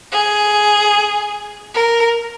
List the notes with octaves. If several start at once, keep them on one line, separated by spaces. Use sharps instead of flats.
G#4
A#4